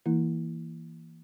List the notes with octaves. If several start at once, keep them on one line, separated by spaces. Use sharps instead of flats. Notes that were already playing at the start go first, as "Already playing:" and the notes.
E3 A#3 E4